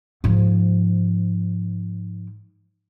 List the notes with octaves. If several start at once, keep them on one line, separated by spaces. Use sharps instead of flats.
G#2 F3